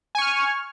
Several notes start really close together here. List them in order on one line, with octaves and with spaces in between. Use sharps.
G#5 C#6 F6